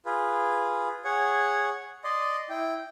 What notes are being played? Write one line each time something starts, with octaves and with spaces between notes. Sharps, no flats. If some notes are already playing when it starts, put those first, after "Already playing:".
F4 G#4 B4
G#4 C#5 F#5
D5 D#5 C6
E4 G5